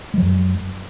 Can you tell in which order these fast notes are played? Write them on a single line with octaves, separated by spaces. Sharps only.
G#3 F#3 F#2